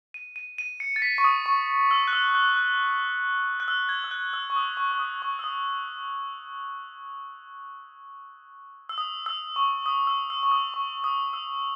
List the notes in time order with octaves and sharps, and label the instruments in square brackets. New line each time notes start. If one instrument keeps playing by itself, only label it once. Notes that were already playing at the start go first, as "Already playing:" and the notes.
[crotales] D#7
D#7
D#7
C#7
A6
B6
C#6
D#6
C#6
E6
F#6
E6
F#6
F#6
F#6
E6
G#6
E6
F#6
E6
C#6
D#6
C#6
C#6
D#6
C#6
E6
D#6
E6
D#6
E6
C#6
D#6
E6
E6
C#6
D#6
C#6
D#6
E6